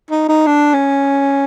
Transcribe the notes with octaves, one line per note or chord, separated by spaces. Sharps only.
D#4
D#4
D4
C#4